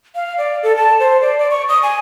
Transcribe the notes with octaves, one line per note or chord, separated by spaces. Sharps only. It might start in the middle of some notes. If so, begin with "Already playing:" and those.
F5
D5
A4
A5
C5
D5
D5
C#6
D#6
G#5